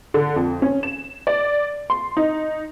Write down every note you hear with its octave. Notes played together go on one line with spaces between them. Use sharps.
D3
F2
C#4
E7
D5
C6
D#4